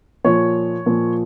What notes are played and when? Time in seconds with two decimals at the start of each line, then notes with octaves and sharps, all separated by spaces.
0.24 A#2 F3 C#5
0.86 A#2 F3